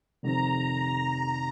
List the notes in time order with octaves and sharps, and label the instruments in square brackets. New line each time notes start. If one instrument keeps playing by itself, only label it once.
[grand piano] F1 F2 C3 D#3 C4 [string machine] A#5